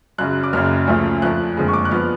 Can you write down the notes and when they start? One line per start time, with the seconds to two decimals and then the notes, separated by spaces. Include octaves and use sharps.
0.18 F#2 C#3 F#3 F#6
0.43 D6
0.53 F#1 F#2 C#3 F6
0.88 D2 C#3 F3 A3
1.22 F2 F3 A3 F#6
1.57 F#1 F2 D3 G#3
1.68 C#6
1.73 D6
1.85 F#6
1.91 F3 B3 F6